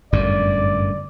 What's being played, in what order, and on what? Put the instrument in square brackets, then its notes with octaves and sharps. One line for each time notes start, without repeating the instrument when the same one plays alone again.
[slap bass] G1 F#2 A2 [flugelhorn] D5